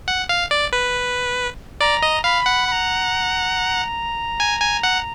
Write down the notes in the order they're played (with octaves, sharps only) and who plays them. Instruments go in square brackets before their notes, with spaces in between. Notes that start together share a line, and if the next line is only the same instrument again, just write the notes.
[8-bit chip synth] F#5
F5
D5
B4
[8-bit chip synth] D5 [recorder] A#5
[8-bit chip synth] D#5
[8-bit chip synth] F5 [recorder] B5
[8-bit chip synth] F#5
[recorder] B5
A#5
[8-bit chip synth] G#5
G#5
F#5